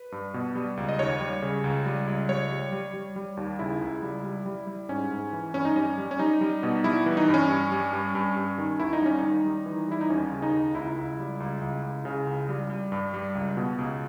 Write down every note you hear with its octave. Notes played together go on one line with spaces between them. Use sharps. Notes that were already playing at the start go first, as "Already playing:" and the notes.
Already playing: B4
G2
B2
G3
C#2
D#5
D#2 C#5
G3
C#3
C#2
G3
C#2
G3 C#5
G3
G3
G3
G3
D#2
C#3 E4
C#2
G3
G3
G3
G3
G#2 C#4
G#2
E3
G2 C#4
D#4
G3 C#4
G3
C#4
G3 D#4
G3
B2
G3 E4
E3
D#4
G2
C#4
G2
G3
G2
G2
G2
D#3
D#2 E4
D#4
G3 C#4
D#3 D#4
G3
E3
G3 E4
D#4
D#2 C#4
C#3
D#4
D#2
C#2 E4
C#2
G3
C#2
C#2
C#2
C#3
C#2
G3
G3
G2
G3
C#2
B2
C#2